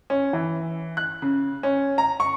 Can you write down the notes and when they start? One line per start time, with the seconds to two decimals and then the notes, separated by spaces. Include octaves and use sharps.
0.10 C#4
0.33 E3
0.97 F#6
1.22 C#3
1.63 C#4
1.98 A#5
2.20 C#6